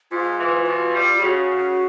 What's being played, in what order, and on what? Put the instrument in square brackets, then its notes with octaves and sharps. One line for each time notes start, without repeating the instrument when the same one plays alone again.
[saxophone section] G#2 [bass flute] F4
[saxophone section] E3
[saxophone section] B2 [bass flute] F4
[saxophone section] G3
[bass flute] G4
[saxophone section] C#3 [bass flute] F#4
[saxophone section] C#3